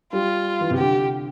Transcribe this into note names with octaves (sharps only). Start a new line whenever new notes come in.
G3 F4
E3
C3
D3 G4